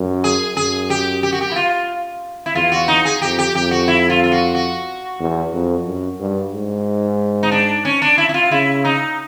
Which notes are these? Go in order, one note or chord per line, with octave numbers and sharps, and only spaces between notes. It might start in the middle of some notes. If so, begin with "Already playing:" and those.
Already playing: F#2
G#4
F#2 G#4
G4
G4
F#4
G4
E4
F4
E4
E2 F4
F#4
D#4
G#4
F2 G4
G4
F2 G4
F#4
E4
F4
F4
F#4
F#4
E2
F2
F#2
G2
G#2
D#4
D4
C#4
D4
E4
E4
F4
C#3 E4
D#4